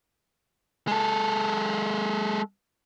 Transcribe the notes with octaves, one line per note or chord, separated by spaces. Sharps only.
G#3 A4